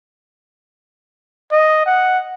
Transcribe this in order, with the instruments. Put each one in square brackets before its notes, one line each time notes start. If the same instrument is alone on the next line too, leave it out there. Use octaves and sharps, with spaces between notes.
[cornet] D#5
F#5